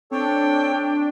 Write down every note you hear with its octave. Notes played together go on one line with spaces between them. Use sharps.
C4 D4 A4 C#5 G5